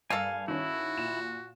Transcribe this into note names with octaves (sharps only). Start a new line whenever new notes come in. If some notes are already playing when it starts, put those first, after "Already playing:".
G2 A#3 A4 F5 G#5
D#3 C#4 E4 F#4
A#2 E7